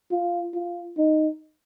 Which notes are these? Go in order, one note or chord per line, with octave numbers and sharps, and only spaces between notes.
F4
F4
D#4